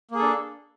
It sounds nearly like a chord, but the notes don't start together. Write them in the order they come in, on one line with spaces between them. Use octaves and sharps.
A#3 G#4 A4 D4